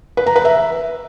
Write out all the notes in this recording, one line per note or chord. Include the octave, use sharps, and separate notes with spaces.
B4
A#5
B4
E5